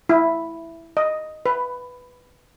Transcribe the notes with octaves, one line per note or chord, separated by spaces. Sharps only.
E4
D#5
B4